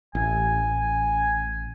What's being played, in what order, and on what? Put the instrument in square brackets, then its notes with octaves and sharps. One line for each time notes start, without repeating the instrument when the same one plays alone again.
[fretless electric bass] A1 [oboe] G#5